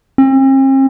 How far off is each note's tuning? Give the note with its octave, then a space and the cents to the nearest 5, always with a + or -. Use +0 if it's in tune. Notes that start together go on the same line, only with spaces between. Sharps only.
C4 +45